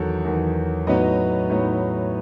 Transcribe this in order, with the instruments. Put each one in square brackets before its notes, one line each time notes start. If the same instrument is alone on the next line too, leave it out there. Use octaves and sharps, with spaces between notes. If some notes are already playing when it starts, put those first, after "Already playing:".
Already playing: [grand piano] E2 D#3 F#3 A4 C#5
E2 D#3 F#3
A2 F#3 B3 D#4 B4 D#5
A2 F#3 B3 D#4